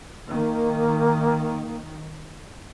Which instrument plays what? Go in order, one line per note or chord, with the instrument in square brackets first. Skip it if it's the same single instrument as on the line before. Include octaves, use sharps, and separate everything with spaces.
[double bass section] D#3 [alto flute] A#3